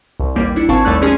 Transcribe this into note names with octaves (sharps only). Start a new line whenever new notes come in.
C2
A1 D#2 G3 A#3
D4 E4 C#7
G#1 C4 F5 A5 C#6 G#6
D#2 G3 A3 D5 F#6
F3 G#3 C#4 G#4